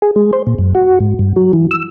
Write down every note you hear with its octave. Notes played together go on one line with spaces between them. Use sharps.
G#4
G#3
C5
A#2
F#2
F#4
G#2
G2
F#3
E3
E6